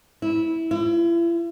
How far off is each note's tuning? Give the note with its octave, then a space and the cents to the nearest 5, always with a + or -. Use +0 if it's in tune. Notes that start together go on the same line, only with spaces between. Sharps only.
E4 -15
E4 +40